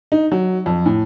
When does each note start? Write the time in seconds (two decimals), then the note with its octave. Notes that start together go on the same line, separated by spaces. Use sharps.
0.12 D#4
0.32 F#3
0.66 F2
0.86 A2